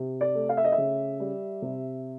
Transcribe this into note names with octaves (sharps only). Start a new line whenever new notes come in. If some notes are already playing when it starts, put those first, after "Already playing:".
Already playing: C3
D5
A3
F5
E5
D#5
E5
C#3
G3
C3